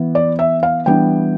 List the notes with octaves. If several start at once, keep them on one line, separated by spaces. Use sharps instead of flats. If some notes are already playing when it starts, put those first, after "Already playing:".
Already playing: E3 B3
D5
E5
F5
E3 G3 B3 D4 G5